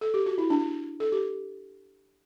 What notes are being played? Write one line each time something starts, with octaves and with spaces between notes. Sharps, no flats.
A4
G4
F#4
E4
D4
A4
G4